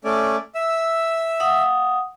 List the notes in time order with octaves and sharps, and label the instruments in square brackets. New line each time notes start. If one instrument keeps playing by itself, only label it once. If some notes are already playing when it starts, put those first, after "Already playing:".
[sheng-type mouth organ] A3 C#4 D5
E5 E6
[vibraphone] F5 F#5 D#6